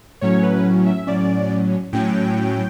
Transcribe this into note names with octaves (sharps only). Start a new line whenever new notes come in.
A2 F#3 C#4 C#5
B4
E5
A2 F#3 C#4 D5
A2 F#3 C#4 G5